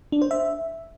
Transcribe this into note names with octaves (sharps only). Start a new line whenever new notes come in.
D4
C5
E5